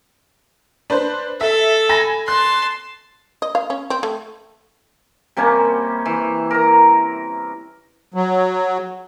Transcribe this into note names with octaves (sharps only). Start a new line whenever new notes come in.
D4 B4 C5
A4 E5
G#5 B5 A#6
A5 C6 F#6
D#5
F5
C#4
C4
A3
C3 G3 A#3 C#4
E3
A#4 A#5
F#3